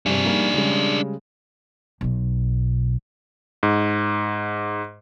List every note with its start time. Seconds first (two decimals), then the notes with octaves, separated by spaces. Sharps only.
0.06 G2 C3 D4 G#4
0.25 G3 A#3 D#4
0.54 C#3 G3 G#3
2.01 B1 B2
3.63 G#2